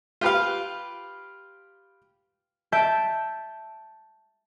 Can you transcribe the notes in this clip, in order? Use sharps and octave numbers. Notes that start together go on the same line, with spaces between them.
F4 G4 B4 F5
E5 A5 G6 D7 E7